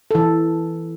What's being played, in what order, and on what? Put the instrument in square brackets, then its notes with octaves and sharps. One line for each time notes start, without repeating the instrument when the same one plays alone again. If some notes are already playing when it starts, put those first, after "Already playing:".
[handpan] E3 A4